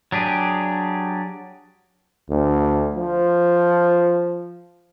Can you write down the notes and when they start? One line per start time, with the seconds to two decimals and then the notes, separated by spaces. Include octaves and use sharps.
0.12 F#3 D4 G4 G#4
2.30 D2
2.95 F3